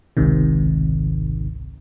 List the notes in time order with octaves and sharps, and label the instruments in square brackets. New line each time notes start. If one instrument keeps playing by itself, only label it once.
[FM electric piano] G#1 C#2 G#2 C3 D#3